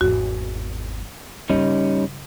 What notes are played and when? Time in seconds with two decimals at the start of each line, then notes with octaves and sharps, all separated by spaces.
0.01 G#1 E2 F#4
1.50 G2 C#3 G3 C#4 D#4